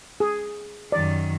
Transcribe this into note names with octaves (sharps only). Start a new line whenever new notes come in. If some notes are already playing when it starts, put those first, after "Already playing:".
G#4
F#2 D#3 D5